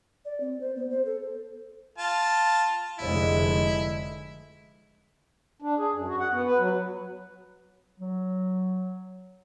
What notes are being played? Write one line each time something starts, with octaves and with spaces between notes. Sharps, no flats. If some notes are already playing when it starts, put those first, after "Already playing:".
D5
C4
C5
B3
C5
A4
F4 A5
F1 D3 G#3 E4
D4
G#4
F#2
F#4
F#5
B3
B4
F#3
F#3